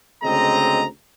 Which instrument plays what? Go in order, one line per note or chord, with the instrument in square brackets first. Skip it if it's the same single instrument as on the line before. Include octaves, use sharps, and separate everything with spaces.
[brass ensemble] D2 C#3 G#3 C4 D#5 A#5